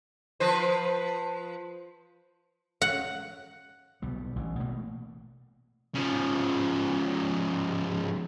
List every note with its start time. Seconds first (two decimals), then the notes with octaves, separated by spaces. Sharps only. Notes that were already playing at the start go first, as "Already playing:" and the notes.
0.40 F3 B4 C5
2.82 F#5
4.02 B1 B2 G3
4.36 A1 E3
4.59 B2 A3 A#3
5.95 C#3 F3